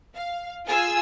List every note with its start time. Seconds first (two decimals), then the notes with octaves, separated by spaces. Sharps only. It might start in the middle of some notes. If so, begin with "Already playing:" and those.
0.14 F5
0.66 F4 G#4 G#5 E6